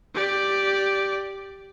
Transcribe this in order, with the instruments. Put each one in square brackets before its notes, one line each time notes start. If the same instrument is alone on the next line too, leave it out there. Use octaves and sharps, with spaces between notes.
[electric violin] G4 D5